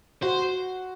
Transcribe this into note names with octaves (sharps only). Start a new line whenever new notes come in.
F#4 C5